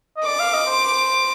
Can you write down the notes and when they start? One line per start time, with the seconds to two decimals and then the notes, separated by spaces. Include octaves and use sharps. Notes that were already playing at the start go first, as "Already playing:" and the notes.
0.17 D#5
0.26 D5 D6
0.40 F5
0.54 D#5
0.67 C5